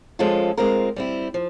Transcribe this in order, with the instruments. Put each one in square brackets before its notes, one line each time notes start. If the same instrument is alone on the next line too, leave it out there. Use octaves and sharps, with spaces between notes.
[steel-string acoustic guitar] F3 G#3 C#4 F4 A4
G#3 C4 F4 A#4
G3 C4 E4
F3